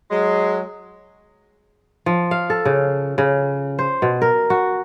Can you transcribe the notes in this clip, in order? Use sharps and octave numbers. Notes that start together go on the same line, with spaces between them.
F#3 G#3
F3
F5
A4
C#3
C#3
C5
B2
A#4
F#4